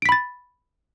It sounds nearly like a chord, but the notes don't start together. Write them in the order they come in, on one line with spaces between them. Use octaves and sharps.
D7 B6 B5 A6